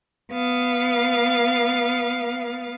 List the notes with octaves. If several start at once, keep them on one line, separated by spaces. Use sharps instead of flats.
B3 F5